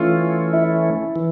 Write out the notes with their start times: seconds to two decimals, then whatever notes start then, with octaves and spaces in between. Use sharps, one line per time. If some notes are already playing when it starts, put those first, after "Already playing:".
Already playing: E3 A3 C#4 F4
0.53 E4
1.16 E3